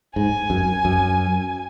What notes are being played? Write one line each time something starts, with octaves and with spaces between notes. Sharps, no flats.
G#2 G#5
F#2
F#2